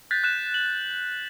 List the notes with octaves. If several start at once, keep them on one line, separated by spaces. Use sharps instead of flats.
F#6 G6 A6 B6
F#6 E7
F#7